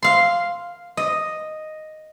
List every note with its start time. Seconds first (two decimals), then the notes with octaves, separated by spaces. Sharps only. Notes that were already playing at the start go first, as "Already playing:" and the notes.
0.02 F5 C6
0.97 D#5